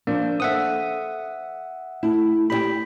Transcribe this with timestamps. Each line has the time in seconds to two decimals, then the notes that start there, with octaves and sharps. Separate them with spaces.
0.07 F3 A#3 D4
0.40 A4 C5 E5 F#5 D#6
2.03 A3 E4
2.50 G4 D#5 G5 B5